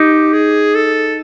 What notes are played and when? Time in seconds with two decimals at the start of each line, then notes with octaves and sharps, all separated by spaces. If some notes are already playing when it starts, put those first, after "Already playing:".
Already playing: D#4 G4
0.33 G#4
0.75 A4